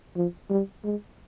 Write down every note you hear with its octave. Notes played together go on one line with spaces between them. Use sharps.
F3
G3
G#3